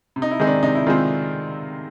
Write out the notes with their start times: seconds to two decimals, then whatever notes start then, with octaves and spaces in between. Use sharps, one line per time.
0.16 C3
0.22 D#4
0.31 E4
0.40 D#3 G#3 C4 D#4
0.47 D4
0.63 C3 D#4
0.75 E4
0.86 D#3 G#3 C4 F4